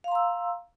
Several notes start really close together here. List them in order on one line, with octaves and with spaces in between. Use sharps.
F5 C6 A#5 E6